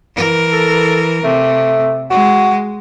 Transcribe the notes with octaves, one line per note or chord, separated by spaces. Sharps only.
E3 A#4
A4
C3 A3
G#3 F#4